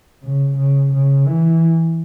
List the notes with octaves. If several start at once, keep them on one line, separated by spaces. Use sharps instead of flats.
C#3
C#3
C#3
E3